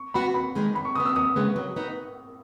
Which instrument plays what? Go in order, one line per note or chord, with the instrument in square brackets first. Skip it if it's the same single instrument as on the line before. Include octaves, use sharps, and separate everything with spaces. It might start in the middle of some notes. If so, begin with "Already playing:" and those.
Already playing: [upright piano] C#6
[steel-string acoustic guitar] B3 F#4 [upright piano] B5
[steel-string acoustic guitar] D#2 [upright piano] B5
[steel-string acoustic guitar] D#3 G#3 B3 D#4
[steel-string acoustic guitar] F#2 [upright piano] B5
[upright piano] C#6
[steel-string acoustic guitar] C#3 F#3 B3 [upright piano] D#6
[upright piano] E6
[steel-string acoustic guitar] D#2 [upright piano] D#6
[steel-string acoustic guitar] C#3 G#3 B3
F#3
B3 D#4